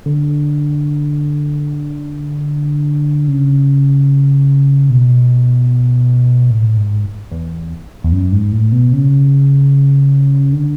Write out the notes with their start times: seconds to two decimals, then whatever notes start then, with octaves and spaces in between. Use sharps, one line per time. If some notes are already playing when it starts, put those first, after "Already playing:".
0.06 D3
3.28 C#3
4.90 B2
6.51 A2
6.77 G#2
7.31 E2
8.04 E2
8.12 F#2
8.32 G#2
8.52 A2
8.72 B2
8.92 C#3
10.53 D3